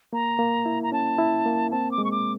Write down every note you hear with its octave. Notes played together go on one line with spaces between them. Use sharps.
A#3 A#5
A#3
E4
A#5
C#4 A5
E4
A#3
C4 A5
D6
G#3
C#6
D6